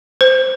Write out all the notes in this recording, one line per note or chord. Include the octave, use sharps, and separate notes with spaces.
C5